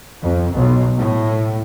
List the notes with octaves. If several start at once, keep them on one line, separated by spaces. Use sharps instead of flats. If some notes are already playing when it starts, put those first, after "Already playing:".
F2
B1
A2